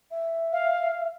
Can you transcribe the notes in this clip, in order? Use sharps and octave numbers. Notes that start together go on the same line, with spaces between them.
E5
F5